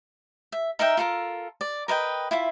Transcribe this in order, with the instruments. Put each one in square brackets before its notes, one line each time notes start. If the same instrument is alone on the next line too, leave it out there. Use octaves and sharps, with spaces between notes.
[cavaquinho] E5
D#4 A#4 E5 G5
F4 A4 A#4
D5
A#4 B4 D#5 G5
E4 F4 E5